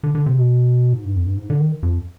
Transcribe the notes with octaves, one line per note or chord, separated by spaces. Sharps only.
D3
D3
C3
B2
G#2
G2
F2
G2
G#2
D3
D#3
F2